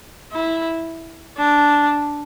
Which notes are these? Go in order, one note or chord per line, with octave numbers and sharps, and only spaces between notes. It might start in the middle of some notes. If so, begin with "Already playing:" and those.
E4
D4